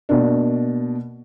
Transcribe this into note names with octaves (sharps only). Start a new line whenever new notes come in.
B2 A#3 D4